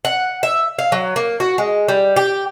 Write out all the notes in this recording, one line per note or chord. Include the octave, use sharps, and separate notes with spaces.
F#5
E5
F5
F#3
A#3
F#4
G#3
G3
G4